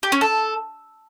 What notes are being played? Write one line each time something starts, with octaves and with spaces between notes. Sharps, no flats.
G4
C#4
A4